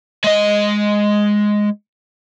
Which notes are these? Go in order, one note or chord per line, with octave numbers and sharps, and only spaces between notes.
G#3 D#5